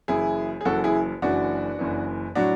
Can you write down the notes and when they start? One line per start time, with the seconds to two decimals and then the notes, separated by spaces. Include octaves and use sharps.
0.08 F#1 F#2 E3 E4 G#4
0.61 G#4
0.65 F#1 F#2 E3 F#4 A4
0.84 E4 G#4
1.22 F#1 F#2 E3 D4 F#4
1.79 F#1 F#2 E3
2.35 A2 F#3 D4 F#4